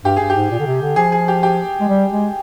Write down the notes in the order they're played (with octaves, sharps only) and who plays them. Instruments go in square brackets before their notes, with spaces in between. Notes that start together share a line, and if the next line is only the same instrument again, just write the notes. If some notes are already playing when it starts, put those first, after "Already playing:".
[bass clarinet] G2 [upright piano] G4
[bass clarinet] G2 [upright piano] G#4
[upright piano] G4
[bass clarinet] G#2
A#2
D3
C3
D3
[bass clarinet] F3 [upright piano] G#4
[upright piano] G#4
G4
G4
[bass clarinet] G#3
G3
G#3